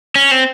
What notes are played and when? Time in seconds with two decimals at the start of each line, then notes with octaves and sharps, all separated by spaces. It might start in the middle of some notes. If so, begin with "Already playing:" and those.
0.16 C#4
0.31 C4